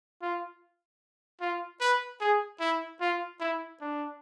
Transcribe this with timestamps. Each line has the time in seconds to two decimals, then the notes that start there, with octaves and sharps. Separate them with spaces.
0.22 F4
1.41 F4
1.80 B4
2.21 G#4
2.60 E4
3.01 F4
3.40 E4
3.81 D4